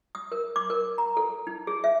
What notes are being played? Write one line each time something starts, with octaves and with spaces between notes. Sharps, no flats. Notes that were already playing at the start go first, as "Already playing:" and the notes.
D#6
A#4
D6
A#4
A#5
A4
D#4
G#4
E5